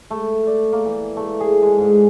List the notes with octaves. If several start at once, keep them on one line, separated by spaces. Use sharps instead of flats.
A3
D5
A#3
E3
A3
G#4
G#3
G#2